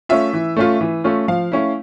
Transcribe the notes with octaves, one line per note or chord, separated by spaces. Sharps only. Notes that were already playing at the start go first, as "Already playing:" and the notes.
A3 C#4 F4 E5
E3
A3 C#4 F4
E3
A3 C#4 F4
F3 F5
A3 C#4 E4